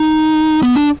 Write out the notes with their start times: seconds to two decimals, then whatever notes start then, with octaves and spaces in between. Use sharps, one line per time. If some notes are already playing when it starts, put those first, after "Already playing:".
Already playing: D#4
0.63 B3
0.75 D4